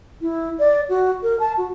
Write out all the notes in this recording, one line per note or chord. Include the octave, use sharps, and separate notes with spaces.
E4
D5
F#4
A#4
A5
F#4